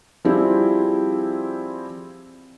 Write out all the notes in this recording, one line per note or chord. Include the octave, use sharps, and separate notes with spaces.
F3 G3 C4 E4 G4 G#4